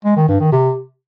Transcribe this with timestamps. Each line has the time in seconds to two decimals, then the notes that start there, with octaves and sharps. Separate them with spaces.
0.05 G#3
0.17 D#3
0.28 G2
0.40 D#3
0.52 C3